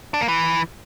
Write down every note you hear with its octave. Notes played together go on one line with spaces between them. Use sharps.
D4
A#3
E3